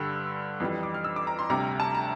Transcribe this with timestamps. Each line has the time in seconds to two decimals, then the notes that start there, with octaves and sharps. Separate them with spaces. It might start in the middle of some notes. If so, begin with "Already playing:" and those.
Already playing: G2 D3 G3 E6
0.60 F2 E3 G3
0.83 D6
0.94 F6
1.04 E6
1.16 D6
1.27 A#5
1.39 C6
1.50 D2 C3 G3 A#5
1.80 A5
1.95 A#5